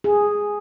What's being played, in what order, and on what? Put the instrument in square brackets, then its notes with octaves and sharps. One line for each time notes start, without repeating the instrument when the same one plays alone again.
[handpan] G#4